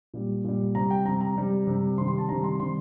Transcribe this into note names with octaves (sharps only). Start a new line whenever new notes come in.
A#2 G3
A#2 G3
C3 G3 A#5
G5
C3 G3 A#5
A#5
C3 G3
C3 G3
C3 D#3 G3 C6
C6
A5
C3 D#3 G3 A#5
C6
C3 D#3 G3 C6